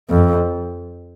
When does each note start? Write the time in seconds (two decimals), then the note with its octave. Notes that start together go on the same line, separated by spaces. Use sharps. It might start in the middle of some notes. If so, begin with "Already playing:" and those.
0.10 F2